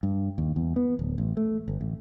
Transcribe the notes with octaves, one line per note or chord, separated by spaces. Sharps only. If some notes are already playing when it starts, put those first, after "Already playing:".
G2
D#2
E2
B3
D1
A1
A3
G1
A1